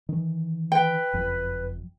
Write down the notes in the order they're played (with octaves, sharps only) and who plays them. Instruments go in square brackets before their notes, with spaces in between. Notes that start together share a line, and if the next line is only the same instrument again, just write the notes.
[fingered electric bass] D#3 E3
[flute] B4 [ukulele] G5
[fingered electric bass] F#1 F2